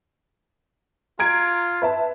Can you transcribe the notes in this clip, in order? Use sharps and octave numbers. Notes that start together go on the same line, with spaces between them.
F4 A#5 G#6 D7
B4 E5 A5